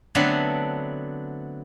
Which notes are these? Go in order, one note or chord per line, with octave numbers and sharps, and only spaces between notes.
D3 F#3 A3 B3 C4 D4